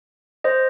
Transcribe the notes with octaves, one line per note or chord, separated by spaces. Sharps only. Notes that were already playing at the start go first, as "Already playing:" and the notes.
C5 D#5